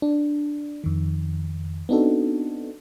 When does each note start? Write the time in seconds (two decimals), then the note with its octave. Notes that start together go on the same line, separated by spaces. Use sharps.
0.02 D4
0.84 F2 D#3
1.89 B3 C4 D4 D#4 F#4 A4